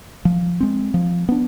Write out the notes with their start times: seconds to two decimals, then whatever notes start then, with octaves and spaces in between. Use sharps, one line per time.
0.25 F3
0.60 G#3 C4
0.94 F3
1.29 B3 D4